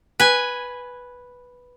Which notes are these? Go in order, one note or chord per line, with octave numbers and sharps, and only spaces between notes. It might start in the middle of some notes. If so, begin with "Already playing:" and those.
B4 G#5